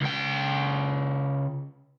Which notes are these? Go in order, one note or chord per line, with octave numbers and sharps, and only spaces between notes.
C#2 G5